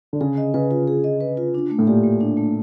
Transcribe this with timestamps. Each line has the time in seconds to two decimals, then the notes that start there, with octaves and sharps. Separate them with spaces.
0.13 D3
0.21 C#3 G#4
0.37 D#5
0.54 C#3 B4
0.71 F4
0.87 G#4
1.04 D#5
1.20 B4
1.37 F4
1.54 D4
1.70 A3
1.79 A2
1.87 A#2 G4
2.04 A3
2.21 D4
2.37 A3